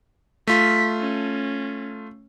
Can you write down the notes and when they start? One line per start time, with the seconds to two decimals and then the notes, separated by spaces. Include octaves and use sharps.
0.47 A3 F4 B6
1.00 C#4